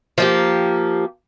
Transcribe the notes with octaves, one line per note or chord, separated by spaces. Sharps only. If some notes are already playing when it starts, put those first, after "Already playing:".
F3 A#3 G4